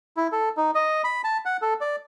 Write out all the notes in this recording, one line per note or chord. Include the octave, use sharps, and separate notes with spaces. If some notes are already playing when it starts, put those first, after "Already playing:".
E4
A4
D#4
D#5
B5
A5
F#5
A4
D5